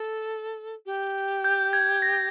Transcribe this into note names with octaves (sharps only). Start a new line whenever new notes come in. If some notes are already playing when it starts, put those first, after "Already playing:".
Already playing: A4
G4
G6
G#6
A#6